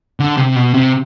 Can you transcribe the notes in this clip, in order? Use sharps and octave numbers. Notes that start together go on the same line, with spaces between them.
D3
C3
B2
C3